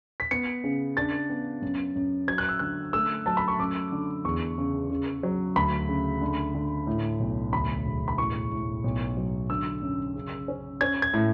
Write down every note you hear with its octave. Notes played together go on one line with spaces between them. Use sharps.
B6
B3 C#7
C#3
D4 A6
B3
F#2
F#2
F#3 G#6
F#6
E6
D3 F#6
A3 E6
F#3 A5
B5
C#6
F#2 D6
D3
E2 C#6
C#3
C#3
F#3
D2 B5
C#3
D3
D3
A2
B1
D2 B5
E1
B5
A2 C#6
A2
B1
F#3
D3 E6
F#2
C#3
C#4
C#4 G#6
G#6
A2